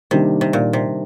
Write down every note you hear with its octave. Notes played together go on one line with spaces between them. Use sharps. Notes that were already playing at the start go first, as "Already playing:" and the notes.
C3 D#3 G3 A#3 D4 G4
C3
A#2
C3